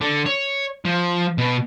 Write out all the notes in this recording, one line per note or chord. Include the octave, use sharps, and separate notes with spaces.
D3
C#5
F3
B2